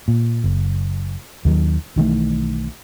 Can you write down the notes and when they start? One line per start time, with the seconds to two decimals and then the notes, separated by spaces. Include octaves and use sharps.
0.08 A#2
0.44 F#1
1.45 D#2 D#3 F3 F#3
1.96 B1 D#3 E3 A3